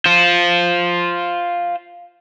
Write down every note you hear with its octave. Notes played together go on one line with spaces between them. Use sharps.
F4 C5